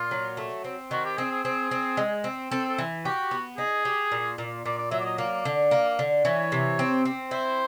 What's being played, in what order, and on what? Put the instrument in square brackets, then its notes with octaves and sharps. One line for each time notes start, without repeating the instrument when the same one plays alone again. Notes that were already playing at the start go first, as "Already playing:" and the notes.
Already playing: [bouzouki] A#2 [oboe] F4
[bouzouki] F#3
A3
C4
[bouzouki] D#3 [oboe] F#4
[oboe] G4
[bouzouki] C4 [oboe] G#4
[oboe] G#4
[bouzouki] C4 [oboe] G#4
[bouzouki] C4
G#3
C4
[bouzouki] C4 [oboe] A4
[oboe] A4
[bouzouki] E3
[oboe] F#4 [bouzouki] G4
[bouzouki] B3
[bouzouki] D#4 [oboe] G#4
[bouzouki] G4
A#2
A#2
[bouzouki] A#2 [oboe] D5
[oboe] D5
[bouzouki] F#3 [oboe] E5
[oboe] D5
D#5
[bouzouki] A#3 [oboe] D5
[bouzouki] D3
A#3
D3
[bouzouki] E3 [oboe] C#5
[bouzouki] C3
C4
C4
[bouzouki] E4 [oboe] C5